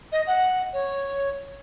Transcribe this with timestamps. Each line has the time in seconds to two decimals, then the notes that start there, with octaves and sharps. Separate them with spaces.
0.12 D#5
0.27 F#5
0.73 C#5